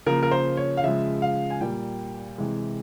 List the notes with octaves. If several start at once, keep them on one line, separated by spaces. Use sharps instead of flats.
C#3 F3 A#3 A#4
A#4
C5
C#5
F5
C#3 F3 G#3 E5
F5
G#5
A#2 G3 A#3 G5
C3 E3 G#3